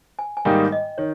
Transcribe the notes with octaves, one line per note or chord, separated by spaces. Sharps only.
G#5
G#5
G#2 D#3 G3 A#3 D#4 G5
D#5
D#3 C#5